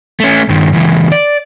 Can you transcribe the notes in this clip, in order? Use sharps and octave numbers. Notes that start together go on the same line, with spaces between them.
A3 C#4
G2 D#3
C#2 E3
D5